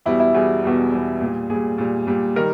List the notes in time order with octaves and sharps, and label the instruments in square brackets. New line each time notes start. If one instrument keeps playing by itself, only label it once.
[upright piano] E2 B2 G3 E4
E4
E2 B2 G3 G#4
E2 B2 G3
E2 B2 G3
A#2 G3
A#2 G3 G#4
A#2 G3
A#2 G3
D#3 G3 A#4